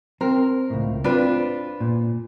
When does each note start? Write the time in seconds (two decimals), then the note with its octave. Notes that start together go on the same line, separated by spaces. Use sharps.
0.21 C4 A#4
0.70 C#2 A2
1.04 C4 D4 F4 B4
1.80 A#2